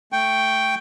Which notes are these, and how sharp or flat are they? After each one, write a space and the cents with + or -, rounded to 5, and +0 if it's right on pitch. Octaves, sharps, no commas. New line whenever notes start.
A3 +0 G5 +0 C#6 +0